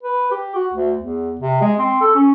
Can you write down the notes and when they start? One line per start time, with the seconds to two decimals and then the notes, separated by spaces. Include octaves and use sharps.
0.03 B4
0.31 G4
0.55 F#4
0.74 D2
0.99 E2
1.41 C3
1.61 G#3
1.79 C4
2.01 A4
2.15 C#4